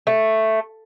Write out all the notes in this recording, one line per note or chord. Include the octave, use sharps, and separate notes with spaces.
A3